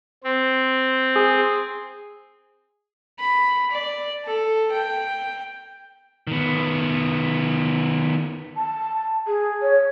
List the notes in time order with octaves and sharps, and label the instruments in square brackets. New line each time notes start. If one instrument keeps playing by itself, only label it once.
[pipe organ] C4
[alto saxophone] G#4
[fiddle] B5
D5
A4
G5
[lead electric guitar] D#3 B3
[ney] A5
G#4
C#5